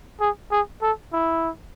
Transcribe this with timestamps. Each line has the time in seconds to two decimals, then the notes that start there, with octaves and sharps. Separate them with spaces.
0.20 G#4
0.51 G#4
0.82 A4
1.13 E4